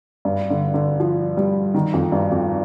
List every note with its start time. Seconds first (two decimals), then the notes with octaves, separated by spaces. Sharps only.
0.25 G2
0.50 D3
0.74 D3
1.00 F3
1.37 G3
1.74 D#3
1.93 F2
2.12 G2
2.31 F2